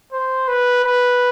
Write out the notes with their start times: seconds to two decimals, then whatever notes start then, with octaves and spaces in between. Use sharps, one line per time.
0.12 C5
0.48 B4
0.84 B4